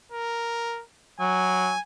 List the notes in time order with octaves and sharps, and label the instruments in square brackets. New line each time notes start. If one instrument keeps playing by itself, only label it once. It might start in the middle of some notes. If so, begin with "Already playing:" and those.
[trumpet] A#4
[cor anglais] F#3 [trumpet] G#5